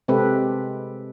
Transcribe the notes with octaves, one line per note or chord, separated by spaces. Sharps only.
C3 G#3 C4 G4 A4 B4